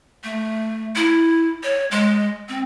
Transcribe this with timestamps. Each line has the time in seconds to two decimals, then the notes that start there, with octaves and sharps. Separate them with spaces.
0.24 A3
0.95 E4
1.63 C#5
1.91 G#3
2.49 C4